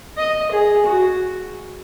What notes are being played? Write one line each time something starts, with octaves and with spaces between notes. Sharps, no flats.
D#5
G#4
F#4